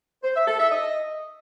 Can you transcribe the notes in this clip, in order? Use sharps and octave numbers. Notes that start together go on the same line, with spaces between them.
C5
E5
A4
E5
D#5